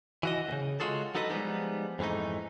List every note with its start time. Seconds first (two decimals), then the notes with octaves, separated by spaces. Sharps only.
0.23 E3 F#4 D#5
0.49 D2 C#3
0.80 G#3 B3 F4 F#4 G#4 A4
1.15 F#3 D#4 A4 B4 D#5
1.30 F3 G3 G#3 B3 D#4
1.99 F2 G#2 E3 A3 D#4